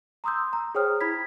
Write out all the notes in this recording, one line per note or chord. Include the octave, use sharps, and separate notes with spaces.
A#5 C6 D#6 E6 G6
A#5
G#4 C5 C#5 G5 D#6 F6
E4 B5 G#6 B6